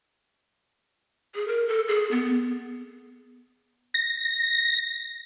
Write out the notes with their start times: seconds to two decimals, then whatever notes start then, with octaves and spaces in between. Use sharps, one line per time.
1.35 G#4
1.48 A#4
1.68 A4
1.88 G#4
2.11 B3
3.94 A#6